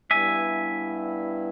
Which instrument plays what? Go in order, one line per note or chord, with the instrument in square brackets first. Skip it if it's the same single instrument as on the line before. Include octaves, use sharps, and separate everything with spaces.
[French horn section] G2 G3 B3 E4 [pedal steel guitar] E5 G#5